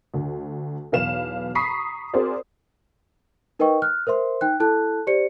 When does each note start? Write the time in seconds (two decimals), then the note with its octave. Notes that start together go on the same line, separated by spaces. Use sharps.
0.14 D2
0.92 B1 E2 B4 F5 E7
1.55 A#5 B5 C#6 D#6 B6 C7
2.13 C4 F#4 G#4 A#4 C5 D5
3.59 D#4 A#4 B4 D#5 G5 C#6
3.82 F6 F#6
4.07 A#4 C5 E5 C6
4.41 D#4 G5 F#6
4.60 E4 A4 A5 F#6
5.07 G4 C5 D5 C#7